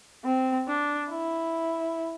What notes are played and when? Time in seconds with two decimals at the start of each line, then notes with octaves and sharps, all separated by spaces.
0.24 C4
0.68 D4
1.10 E4